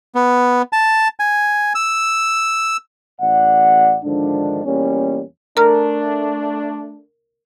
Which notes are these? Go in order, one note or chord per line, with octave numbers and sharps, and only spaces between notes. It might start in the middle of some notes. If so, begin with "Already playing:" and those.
B3
A5
G#5
E6
A1 D5 F#5
G#2 D3 D#3 F3 D4
E2 A#2 G3 A#3 C#4
A3 D4 A#4 A#5 F6